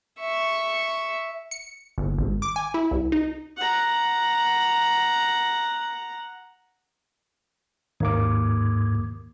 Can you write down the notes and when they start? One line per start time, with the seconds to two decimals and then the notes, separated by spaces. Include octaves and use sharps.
0.20 E5 C#6
1.51 C#7
1.98 G1
2.18 G#1
2.42 D6
2.56 G#5
2.74 E4
2.91 C2
3.12 D#4
3.57 F#5 A#5
8.00 D#2 G#2 A#3 D6